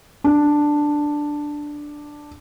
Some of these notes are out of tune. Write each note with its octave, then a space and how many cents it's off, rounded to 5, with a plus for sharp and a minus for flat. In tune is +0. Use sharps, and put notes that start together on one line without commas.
D4 +5